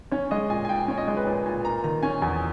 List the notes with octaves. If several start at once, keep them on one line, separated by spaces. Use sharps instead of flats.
C#4 C#5
G#3 D#5
A#2 G#5
G#5
A#2 G5
C#4 C#5
D#5
G#3 D#5
B4
A#2 C#5
A#2 G#5
A#3 A#5
D#3 A#5
C#4 G#5
E2 G#5